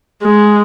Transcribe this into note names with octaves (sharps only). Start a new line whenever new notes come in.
G#3